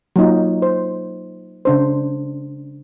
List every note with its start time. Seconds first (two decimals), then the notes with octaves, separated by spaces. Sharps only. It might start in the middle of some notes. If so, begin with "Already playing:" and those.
0.16 F#3 A#3 D#4 F4
0.62 C5
1.65 C#3 D4 C5